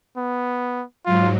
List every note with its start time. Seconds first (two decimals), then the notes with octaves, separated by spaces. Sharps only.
0.17 B3
1.06 G#2 F#3 F4